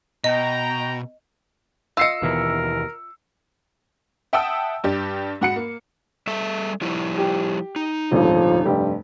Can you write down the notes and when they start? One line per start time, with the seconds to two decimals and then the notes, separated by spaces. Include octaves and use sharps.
0.24 B2 D#5 G5 A#5
1.97 F4 D#5 E6 C7 C#7
2.22 D#2 B2 E3 A#4
4.33 E5 F#5 G5 A5 D#6 E6
4.84 G2 G4 D5
5.41 G#2 F#4 F#5 B5 C#7
5.56 A#3
6.27 G3 A4 E5
6.81 F3 G3 E4
7.18 G4
7.76 D#4
8.12 D#1 G#1 D2 F3
8.65 F1 G2 G4